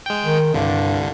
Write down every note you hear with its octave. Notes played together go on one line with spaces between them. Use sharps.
G#3 G5
D#3
C2 G2 D3